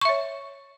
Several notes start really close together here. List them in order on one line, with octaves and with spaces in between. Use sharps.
C#6 E5 C#5